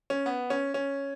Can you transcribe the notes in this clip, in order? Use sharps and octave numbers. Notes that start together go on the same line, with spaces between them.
C#4
B3
C#4
C#4